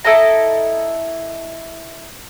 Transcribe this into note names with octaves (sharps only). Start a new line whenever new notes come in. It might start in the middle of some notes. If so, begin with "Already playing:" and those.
E4 A4 D#5 A#5